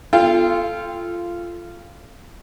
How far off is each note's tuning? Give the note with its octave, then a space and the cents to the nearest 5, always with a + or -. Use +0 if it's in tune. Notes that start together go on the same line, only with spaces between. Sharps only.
F4 -15 A4 -10 G5 +20